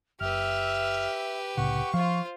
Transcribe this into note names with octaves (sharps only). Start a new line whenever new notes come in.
F#1 G4 B4 E5 F6
C2 A2 C#3 F#5 C#6
F3 F4 C5 F5